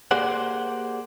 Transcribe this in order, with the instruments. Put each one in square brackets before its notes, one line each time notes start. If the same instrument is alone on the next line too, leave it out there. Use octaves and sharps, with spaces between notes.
[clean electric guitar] A#3 G4 G#4 C5 D5 F#5